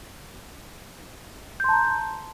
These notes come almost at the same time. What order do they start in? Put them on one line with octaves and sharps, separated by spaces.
G6 C6 A5 A#5